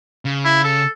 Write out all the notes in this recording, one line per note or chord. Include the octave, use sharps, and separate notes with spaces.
C#3
E4
A4